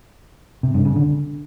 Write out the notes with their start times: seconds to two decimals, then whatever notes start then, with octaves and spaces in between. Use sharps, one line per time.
0.63 C3
0.74 G2
0.85 C#3
0.96 D3